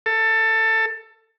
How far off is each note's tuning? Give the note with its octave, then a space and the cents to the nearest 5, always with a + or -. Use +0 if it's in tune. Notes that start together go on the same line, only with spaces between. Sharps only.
A4 +20